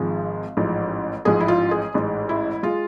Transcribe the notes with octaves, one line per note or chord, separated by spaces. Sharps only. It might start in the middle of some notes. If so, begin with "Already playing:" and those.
Already playing: G#1 G#2 F3 G#3
A1 G#2 F3
A1 G#2 F3 G#4
E4
F4
G#4
A1 G#2 G#3
E4
G#3 F4